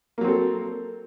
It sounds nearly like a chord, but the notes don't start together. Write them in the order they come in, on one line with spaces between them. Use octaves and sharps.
A#3 F#3 C4 A4